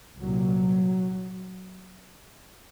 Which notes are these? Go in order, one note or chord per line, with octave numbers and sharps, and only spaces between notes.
C2 A#2 F#3